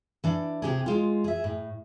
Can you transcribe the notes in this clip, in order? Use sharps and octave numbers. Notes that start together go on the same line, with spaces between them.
E3 D4
C3 G4 G#4
G#3 F4
G#4 E5
A2